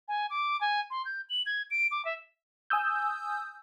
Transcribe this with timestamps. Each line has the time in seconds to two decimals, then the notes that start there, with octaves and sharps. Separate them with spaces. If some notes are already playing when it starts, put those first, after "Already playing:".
0.08 G#5
0.30 D6
0.61 G#5
0.90 C6
1.05 G6
1.29 F#7
1.46 G#6
1.71 D7
1.91 D6
2.05 E5
2.70 G#5 D#6 E6 G6